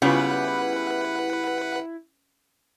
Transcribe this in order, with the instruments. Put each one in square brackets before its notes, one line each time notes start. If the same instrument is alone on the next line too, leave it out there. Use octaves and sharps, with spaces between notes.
[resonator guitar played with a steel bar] C#3 G3 B3 [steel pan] C#4 F4 [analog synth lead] E4 [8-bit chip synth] B4 F#5